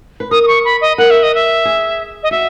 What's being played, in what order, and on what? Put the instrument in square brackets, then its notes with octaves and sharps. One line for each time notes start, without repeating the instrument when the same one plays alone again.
[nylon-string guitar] B4
[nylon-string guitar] A#4 [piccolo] D#6
[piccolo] D#6
C#6
B5
D#5
[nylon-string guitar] A#4 [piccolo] F#5
[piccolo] E5
D#5
E5
[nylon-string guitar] G#4
[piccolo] D#5
[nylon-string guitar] F#4 [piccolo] E5